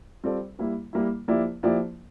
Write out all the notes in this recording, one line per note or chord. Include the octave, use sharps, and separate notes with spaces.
G3 C4 F4 A4 D5
G3 A#3 E4
G3 A#3 E4
F3 A#3 E4 G4 D5
F3 A#3 E4 G4 D5